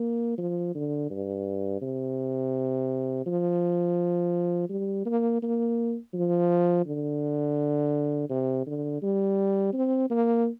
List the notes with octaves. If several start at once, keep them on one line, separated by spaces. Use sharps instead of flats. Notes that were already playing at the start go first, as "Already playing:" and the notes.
Already playing: A#3
F3
D3
G2
C3
F3
G3
A#3
A#3
F3
D3
C3
D3
G3
C4
A#3